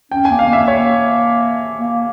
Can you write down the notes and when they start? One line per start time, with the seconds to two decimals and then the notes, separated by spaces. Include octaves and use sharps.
0.11 C#4 G5
0.25 G#5
0.31 A#3
0.39 F5
0.49 A#3 E5
0.68 C#5
1.78 A#3